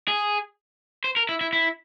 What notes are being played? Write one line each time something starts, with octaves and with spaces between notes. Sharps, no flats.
G#4
C5
A#4
E4
E4
E4